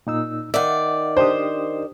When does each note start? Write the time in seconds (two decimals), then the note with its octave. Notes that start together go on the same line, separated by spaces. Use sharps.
0.07 A#2 D#4 E6
0.54 D#3 D5 E5 F#5
1.17 D4 G4 C5 D#6